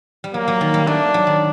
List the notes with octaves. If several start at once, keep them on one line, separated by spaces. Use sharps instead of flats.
G3
F#3 A#3
F#3
D#3
G3
A3 D4
F#3
D#3